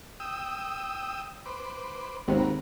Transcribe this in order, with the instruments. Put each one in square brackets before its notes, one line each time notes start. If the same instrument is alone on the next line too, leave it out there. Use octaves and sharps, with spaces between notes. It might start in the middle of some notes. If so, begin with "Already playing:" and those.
[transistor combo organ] G5 D#6 E6
B4 C5 D6
[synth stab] G#1 D#2 C3 [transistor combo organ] F#4 A#4 B4